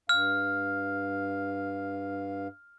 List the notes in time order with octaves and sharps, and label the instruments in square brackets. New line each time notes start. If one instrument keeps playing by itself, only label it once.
[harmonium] G2 F5 [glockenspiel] F6